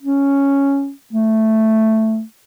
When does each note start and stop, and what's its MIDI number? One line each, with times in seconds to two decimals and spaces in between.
0.03 0.91 61
1.13 2.23 57